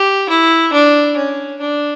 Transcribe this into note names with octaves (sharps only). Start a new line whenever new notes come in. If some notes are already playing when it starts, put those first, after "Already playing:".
Already playing: G4
E4
D4
C#4
D4